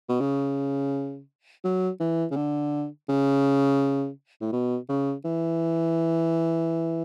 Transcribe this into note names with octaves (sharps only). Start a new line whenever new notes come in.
B2
C#3
F#3
E3
C#3
D3
C#3
A2
B2
C#3
E3